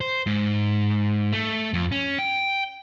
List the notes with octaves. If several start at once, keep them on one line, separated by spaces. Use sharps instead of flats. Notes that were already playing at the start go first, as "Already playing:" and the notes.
C5
G#2
A3
F2
C#4
G5